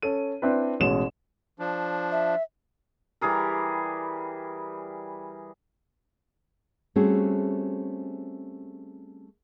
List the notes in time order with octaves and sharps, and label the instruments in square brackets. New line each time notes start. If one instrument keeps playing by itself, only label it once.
[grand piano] C#4 A4 D#7
C4 D4 E4 B4
A1 B2 G#3 C#4 E7
[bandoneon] F3 D4
[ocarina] E5
[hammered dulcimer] E3 G3 G#4 A#4
[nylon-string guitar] G3 A3 C4 C#4 F#4 G#4